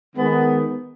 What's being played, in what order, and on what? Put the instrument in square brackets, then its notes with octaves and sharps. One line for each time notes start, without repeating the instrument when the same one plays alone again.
[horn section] D#3 G#3 B3